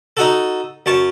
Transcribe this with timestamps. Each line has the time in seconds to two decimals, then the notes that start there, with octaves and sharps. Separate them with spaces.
0.17 D#4 F#4 A4
0.86 F#2 A5 C#6